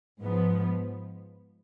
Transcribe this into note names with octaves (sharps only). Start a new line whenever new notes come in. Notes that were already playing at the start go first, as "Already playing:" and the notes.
G#2 F3 B3